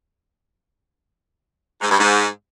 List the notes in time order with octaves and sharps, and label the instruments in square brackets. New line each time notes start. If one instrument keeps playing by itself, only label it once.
[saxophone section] G#2
G2
G#2